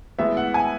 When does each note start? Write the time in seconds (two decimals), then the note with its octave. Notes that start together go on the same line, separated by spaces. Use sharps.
0.18 A2 E3 G#3 B3 E5
0.37 F#5
0.54 G#5